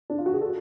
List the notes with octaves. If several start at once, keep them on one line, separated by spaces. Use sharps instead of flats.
D4
F4
F#4
G#4
A4